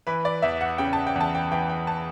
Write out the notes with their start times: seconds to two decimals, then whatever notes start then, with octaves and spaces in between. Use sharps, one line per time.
0.07 E3 B4
0.25 D5
0.42 E2 E5
0.61 F#5
0.78 C#3 G5
0.93 A5
1.07 G5
1.16 E2 A5
1.35 G5
1.52 E3 G5
1.69 G5
1.87 A5